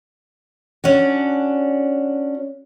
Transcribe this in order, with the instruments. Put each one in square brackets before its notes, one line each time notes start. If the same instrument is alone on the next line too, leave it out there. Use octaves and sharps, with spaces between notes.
[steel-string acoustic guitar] C#4 D4 F#4